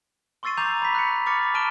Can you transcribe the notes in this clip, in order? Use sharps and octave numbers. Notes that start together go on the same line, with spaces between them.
C6 C#6 E6 A6 C7 D#7
A#5 C#6 D6 G6 F7
B5 B6
F#6 C#7
B5 C#6 D6 F6 A6 C#7
A5 A#5 F6 D7 D#7 G7